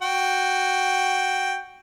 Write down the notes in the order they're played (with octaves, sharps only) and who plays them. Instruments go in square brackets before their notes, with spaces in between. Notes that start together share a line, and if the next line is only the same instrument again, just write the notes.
[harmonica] F#4 G5